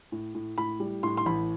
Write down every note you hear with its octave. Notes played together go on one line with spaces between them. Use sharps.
A2
A2
A2 B5
G3
A2 C6
C6
A1 B5